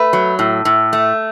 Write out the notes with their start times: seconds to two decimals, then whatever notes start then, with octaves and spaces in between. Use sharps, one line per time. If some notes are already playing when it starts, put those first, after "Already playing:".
Already playing: A3 B4
0.13 F#3
0.39 A2
0.65 A2
0.93 A3